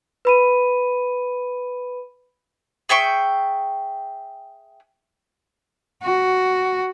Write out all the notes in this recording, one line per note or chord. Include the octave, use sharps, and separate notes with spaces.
B4 B5 D#7
G#4 E5 G5 C#6
F#4